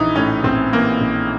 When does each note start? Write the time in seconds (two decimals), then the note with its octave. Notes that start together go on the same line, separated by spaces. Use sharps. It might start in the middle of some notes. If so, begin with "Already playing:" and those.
Already playing: A#1 E3 D#4 E4
0.16 A2 C#4
0.44 A#1 C4
0.73 E3 A#3
1.01 A#1